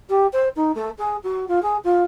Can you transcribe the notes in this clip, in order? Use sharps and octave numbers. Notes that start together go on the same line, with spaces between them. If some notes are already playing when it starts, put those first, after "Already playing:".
G4
C5
D#4
A3
G#4
F#4
F4
G#4
F4